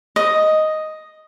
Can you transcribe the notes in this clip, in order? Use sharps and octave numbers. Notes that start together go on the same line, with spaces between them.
D#5